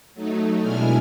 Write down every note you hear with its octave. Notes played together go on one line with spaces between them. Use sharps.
F#3 A3 D#4
B2 G#3 D4 E4 G#5 F6